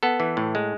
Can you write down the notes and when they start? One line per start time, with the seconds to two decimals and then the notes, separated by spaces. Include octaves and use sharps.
0.03 B3 A4
0.20 E3
0.37 A2
0.55 G#3